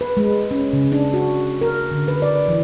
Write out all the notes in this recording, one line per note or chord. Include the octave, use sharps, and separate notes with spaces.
B4
G#3
C#4
C#3
D4
F#4
A#4
D3
B4
D5
E3